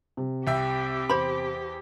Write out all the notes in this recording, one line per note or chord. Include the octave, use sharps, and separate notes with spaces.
C3
C2 G4 E5 G5
E2 C5 B5